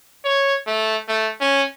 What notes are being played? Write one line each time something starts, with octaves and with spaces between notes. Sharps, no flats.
C#5
A3
A3
C#4